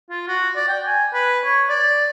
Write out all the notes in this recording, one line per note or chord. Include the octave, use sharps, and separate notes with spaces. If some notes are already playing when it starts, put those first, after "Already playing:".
F4
F#4
D5
G5
G#5
B4
C#5
D5